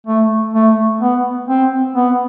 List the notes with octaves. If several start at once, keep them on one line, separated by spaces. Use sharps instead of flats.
A3
A3
B3
C4
B3